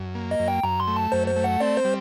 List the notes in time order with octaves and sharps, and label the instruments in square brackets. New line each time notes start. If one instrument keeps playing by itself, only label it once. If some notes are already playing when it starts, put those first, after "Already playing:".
Already playing: [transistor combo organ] F#2
A#3
[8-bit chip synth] D#5
[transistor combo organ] F#2
[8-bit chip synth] G5
[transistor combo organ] F#2 [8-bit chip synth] A#5
[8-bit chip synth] C6
[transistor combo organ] A3
[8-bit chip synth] A5
[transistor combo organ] F#2 [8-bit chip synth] C5
[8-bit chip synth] C5
[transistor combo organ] A3
[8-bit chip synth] F#5
[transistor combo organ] C4 [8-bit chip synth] D5
[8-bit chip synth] C5
[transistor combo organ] G3